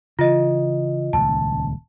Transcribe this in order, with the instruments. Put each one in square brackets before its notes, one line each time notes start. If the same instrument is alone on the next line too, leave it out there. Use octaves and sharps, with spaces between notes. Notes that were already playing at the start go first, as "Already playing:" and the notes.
[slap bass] C#3 E3 [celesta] F4 D#5
[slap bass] D#1 C#2 [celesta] A5